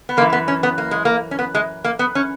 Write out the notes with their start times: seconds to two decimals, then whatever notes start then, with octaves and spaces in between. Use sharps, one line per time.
0.09 B3
0.17 F#2 A#3
0.21 E3
0.33 B3
0.48 C#4
0.63 B3
0.78 A#3
0.91 G#3
1.05 A#3
1.31 C#4
1.39 B3
1.55 G#3
1.85 A#3
1.99 B3
2.15 C#4